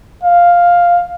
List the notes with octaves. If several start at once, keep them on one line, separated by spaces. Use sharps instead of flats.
F5